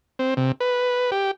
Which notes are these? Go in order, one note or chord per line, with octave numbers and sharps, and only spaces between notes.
C4
C3
B4
G4